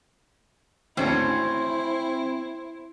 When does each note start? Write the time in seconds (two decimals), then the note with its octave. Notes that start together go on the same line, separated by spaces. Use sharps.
0.97 G#1 D2 E3 C4 C#4 E4 C5 C#5